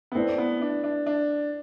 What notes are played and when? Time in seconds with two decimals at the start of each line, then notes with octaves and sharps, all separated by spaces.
0.12 B3
0.15 A3 C4 E4 B4 D5
0.38 B3
0.62 D4
0.84 D4
1.06 D4